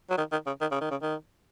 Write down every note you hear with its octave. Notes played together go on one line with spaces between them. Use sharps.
F#3
D#3
D#3
C#3
D#3
C#3
D#3
C#3
D#3